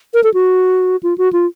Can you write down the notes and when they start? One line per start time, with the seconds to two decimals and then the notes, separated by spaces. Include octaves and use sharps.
0.14 A#4
0.24 A4
0.34 F#4
1.03 F4
1.18 F#4
1.33 F4